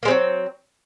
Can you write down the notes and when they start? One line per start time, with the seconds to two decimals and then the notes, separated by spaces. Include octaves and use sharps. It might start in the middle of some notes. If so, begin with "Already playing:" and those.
0.03 A#3
0.05 G#3
0.08 C4
0.10 F#3